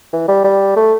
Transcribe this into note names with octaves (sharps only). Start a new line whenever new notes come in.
E3
G3
G3
A3